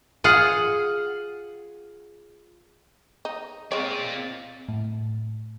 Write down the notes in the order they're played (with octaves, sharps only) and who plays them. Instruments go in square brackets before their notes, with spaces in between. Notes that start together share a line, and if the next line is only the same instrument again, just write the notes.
[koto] F4 G#4 F#5
[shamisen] D#4
[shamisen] G#3 C#5 [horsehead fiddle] C4 [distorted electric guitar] F4 D5
[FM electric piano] A2